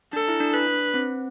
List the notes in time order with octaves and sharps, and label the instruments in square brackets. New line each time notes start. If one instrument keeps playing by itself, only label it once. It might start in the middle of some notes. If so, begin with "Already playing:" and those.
[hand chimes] D4 [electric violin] A4
[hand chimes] E4
D4
[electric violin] B4
[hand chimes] D4
C4